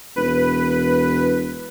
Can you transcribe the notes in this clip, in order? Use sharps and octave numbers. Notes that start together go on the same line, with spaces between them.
E1 B4